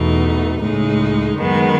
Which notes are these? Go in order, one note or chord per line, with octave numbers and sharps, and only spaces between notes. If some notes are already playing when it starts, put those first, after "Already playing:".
Already playing: E2 B2 E3 A3 D#4
C#2 A2 C#3 G#3 D#4
F#2 D#3 G#3 B3